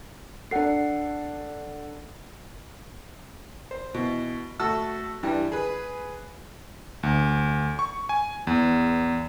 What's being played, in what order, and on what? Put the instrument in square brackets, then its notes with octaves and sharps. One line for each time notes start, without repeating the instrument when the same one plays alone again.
[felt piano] D4 A4 [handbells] F#5 C7
[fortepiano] C5
B2 E3
A3 F#4 A4 E6
G2 E3 G3
G#4 B4
[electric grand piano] D2
C#6
G#5
E2